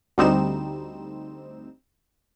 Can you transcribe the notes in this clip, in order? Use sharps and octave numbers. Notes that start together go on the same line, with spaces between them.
D2 G3 C4 D#4 E7